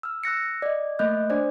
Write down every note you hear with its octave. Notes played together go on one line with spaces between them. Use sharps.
E6 F6
E6 F#6 A#6 C#7
D5 D#5
A3 A#3 D#5 F#6 G6
D4 C5 D5